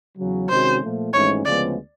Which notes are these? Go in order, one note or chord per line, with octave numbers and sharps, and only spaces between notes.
E2 C#3 F#3
C3 D#3 G#3 C#4 F#4 C5
A#2 F3 A3
G#1 G#2 E3 A3 C#4 C#5
D2 C#3 F3 G#3 B3 D5